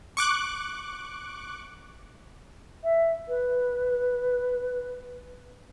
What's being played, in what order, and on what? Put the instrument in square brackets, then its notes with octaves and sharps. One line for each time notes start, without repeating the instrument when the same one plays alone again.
[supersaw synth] C#6 D6 F#6
[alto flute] E5
B4